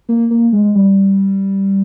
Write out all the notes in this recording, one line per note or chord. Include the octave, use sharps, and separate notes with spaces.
A#3
A#3
G#3
G3